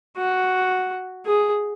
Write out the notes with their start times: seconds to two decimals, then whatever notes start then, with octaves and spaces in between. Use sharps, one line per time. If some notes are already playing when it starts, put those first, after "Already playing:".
0.18 F#4
1.26 G#4